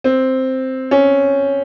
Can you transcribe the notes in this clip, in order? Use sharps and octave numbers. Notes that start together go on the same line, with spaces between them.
C4
C#4